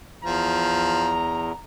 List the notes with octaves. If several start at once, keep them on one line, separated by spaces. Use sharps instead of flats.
E2 F3 A#5